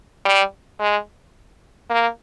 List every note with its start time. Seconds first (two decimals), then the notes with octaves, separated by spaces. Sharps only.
0.25 G3
0.80 G#3
1.90 A#3